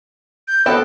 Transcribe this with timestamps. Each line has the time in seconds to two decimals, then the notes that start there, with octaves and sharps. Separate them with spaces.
0.48 G6
0.66 B3 F#4 A4 C5 G5 A5 B5